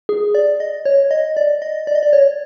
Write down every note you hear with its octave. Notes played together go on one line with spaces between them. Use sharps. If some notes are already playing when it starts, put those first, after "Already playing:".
G#4
D5
D#5
C#5
D#5
D5
D#5
D5
D#5
D5
C#5